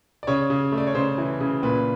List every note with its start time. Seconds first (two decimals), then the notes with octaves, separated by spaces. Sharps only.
0.23 D5
0.27 C#3 C#5
0.50 C#3
0.72 A3
0.78 D5
0.87 C#5
0.95 C#3 C5
1.18 E3
1.41 C#3
1.63 A#2 B4